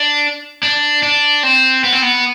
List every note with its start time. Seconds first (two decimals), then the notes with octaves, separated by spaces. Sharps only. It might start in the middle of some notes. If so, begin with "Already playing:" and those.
Already playing: D4
0.63 D4
1.03 D4
1.43 C4
1.84 B3
1.92 C4
2.02 B3